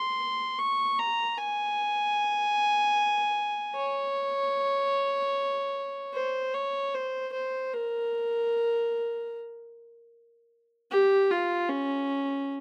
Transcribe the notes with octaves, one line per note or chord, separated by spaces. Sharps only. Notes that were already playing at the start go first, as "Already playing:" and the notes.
Already playing: C6
C#6
A#5
G#5
C#5
C5
C#5
C5
C5
A#4
G4
F4
C#4